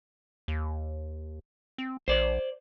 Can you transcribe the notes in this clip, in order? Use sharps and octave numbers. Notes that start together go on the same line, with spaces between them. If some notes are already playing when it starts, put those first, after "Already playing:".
D#2
C4
A#1 C5 D5